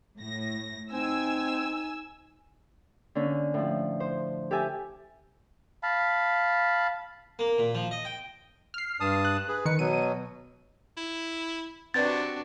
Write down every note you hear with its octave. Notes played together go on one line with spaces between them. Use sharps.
A2 A#6
C4 D#4 G#5 E6
D3 A#3 C#4
A2 F3
C5
G4 A4 E5 G#5
F5 A5 B5
A#3
A#2
F3
D#5
G5
F6 C7
G2 A5 D#6
F#6
G#4 B4
D#3 B4 C#7
B2 F#3 D#7
E4
C3 C4 D4 F#4 B4 D5 A6